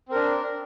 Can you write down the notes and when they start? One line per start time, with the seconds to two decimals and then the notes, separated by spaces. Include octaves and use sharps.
0.09 C4
0.12 A#4
0.15 D4